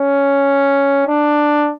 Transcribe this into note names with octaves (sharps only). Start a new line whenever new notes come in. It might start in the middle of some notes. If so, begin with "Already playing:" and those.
Already playing: C#4
D4